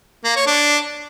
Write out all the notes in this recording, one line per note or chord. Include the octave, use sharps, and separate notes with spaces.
A#3
C#5
D4